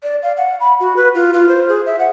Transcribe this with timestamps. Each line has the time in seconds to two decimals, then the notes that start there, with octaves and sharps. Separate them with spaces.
0.03 D5
0.23 F5
0.37 F#5
0.60 B5
0.80 F#4
0.96 B4
1.15 F4
1.34 F4
1.49 C5
1.69 G#4
1.86 E5
1.99 F#5